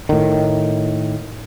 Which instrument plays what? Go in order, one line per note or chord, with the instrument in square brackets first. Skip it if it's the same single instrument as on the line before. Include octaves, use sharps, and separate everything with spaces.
[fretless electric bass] A2 D#3